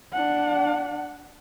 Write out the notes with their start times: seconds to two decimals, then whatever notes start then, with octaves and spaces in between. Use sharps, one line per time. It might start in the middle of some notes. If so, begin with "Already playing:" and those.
0.13 D4 F#5